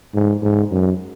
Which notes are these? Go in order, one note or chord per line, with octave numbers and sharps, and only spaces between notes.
G#2
G#2
F#2